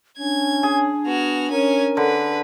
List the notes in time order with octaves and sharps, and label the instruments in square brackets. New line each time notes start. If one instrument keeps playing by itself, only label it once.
[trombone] C#4 [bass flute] D4 [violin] G#6
[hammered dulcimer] G#4
[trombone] B3 [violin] F#4 F6
[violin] C#4 G#5 [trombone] A#4
[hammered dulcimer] D3 [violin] B4